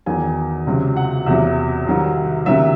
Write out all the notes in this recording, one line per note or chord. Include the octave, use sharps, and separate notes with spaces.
E2 D#3 F#3 G#5
C#2 C3 F#3
F#5
E2 C3 F#3 E5
C2 C3 D#3 F#3
C#2 C3 D#3 F#3 E5